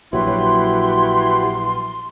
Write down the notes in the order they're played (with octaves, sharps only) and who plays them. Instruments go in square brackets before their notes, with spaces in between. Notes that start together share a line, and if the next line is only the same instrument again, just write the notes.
[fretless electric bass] A#1 F#3 [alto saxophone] E4 [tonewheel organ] F#4 G4 B4 [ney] C6